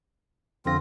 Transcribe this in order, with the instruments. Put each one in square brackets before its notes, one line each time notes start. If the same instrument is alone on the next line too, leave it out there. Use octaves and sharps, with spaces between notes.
[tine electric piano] F2 D3 A#6 [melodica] C4 F4